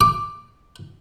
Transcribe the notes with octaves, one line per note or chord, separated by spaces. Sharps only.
D6